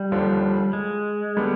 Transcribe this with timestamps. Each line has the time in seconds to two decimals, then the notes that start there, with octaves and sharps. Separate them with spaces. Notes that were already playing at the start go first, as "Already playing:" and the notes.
Already playing: G3
0.12 D#2 D3 F3
0.73 G#3
1.37 D3 G3 B3